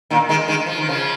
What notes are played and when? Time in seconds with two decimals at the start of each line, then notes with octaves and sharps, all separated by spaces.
0.10 A#2 D#3
0.29 D#3 G#3
0.48 D#3 G#3
0.66 F3
0.78 D#3
0.89 C#3 F3